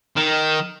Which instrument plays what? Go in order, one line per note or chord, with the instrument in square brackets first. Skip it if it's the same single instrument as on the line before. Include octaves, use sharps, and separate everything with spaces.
[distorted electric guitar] D#3